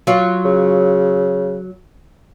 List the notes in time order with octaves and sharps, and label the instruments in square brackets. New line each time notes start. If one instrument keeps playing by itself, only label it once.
[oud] F#3 F4
[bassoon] C#3